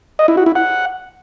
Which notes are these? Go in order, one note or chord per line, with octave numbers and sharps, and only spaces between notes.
D#5
E4
F#4
E4
F#5